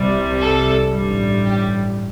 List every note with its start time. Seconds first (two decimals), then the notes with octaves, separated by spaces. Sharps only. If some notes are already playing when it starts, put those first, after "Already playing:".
Already playing: C2 C3 G3
0.39 A4
0.92 A1 G2 G3
1.45 G4